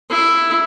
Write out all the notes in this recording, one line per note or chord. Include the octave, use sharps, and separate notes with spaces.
E4